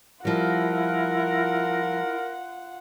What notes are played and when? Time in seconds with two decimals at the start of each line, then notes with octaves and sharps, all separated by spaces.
0.25 F3 G3 E4 F4 A#4 F#5